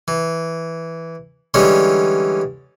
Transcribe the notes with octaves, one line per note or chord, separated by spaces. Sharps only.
E3
D3 E3 G3 G#3 C#4